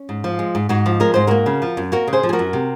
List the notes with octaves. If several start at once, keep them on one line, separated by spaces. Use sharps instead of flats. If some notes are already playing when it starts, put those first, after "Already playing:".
Already playing: C#4
G#2
F3
G#3
G#2
G#2 D#4 F#4
F3
G#3 A#4
G#2 C5
A#3 F#4 A#4
C#3
F3
F#2
A#3 F#4 A#4
C#3
G#4 C5
F3
G#4
F#4 A#4
F#2
C3